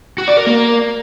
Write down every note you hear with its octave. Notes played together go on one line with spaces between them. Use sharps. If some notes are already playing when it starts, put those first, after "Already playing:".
F#4
D5
A#4
A#3